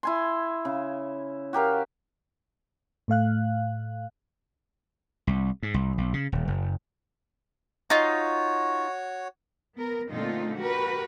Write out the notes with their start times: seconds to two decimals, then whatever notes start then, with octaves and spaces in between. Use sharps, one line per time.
0.03 E4 G#5 C6
0.65 C#3
1.53 F#4 G4 A#4 F5
3.08 A2 A3 F5 F#6
5.27 C2
5.63 G#2
5.74 C2
5.98 B1
6.14 C#3
6.32 D#1
6.48 F#1
7.90 D#4 F4 F#4 C#5
9.74 B3 A#4
10.09 A#2 D3 A3 C4 D#4 F4
10.56 F#4 G4 A#4 B4